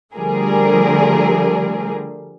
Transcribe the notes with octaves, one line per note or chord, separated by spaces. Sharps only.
D3 F3 G3 A3 G#4 A#4